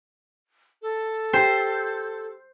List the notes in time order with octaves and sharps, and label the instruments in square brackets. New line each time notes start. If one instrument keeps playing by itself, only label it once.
[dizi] A4
[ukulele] G4 [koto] C5